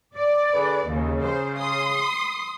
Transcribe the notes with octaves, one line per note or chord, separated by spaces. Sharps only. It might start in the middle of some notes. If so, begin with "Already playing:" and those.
D5
D3 G#4 B4
D#2 C#3
C5
C6 D#6